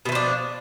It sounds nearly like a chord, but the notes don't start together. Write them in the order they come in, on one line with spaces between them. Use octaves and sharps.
B2 E3 F3 D4